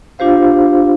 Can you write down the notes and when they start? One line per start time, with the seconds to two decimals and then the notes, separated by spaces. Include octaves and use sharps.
0.19 D4 F4 G4 C5 F5